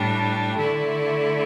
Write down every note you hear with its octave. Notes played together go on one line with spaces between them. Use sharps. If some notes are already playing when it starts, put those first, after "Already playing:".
Already playing: A2 G3 D4
D3 A3 E4